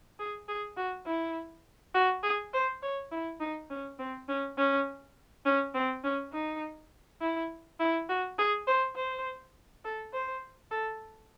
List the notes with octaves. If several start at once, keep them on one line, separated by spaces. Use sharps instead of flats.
G#4
G#4
F#4
E4
F#4
G#4
C5
C#5
E4
D#4
C#4
C4
C#4
C#4
C#4
C4
C#4
D#4
E4
E4
F#4
G#4
C5
C5
A4
C5
A4